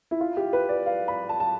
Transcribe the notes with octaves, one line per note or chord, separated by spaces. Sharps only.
E4
F4
G4
B4
D5
F5
B5
A5
A5